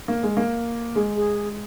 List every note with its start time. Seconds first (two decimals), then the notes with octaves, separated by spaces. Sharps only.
0.08 A#3
0.23 G#3
0.37 A#3
0.95 G#3 G#4
1.16 G#4